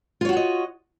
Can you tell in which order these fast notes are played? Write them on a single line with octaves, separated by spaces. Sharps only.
F4 C#5 F#4 F#5 D#5